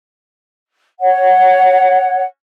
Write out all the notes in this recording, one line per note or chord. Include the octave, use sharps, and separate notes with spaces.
C#5 F#5